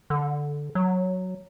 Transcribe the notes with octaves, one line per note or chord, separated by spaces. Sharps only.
D3
F#3